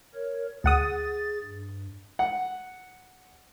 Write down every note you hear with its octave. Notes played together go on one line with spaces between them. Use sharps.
A#4 C#5
D2 G#4 F#5 D#6 A6
G2
F#5